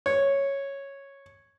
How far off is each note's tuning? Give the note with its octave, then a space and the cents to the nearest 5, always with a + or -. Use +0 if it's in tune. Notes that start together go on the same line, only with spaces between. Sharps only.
C#5 -5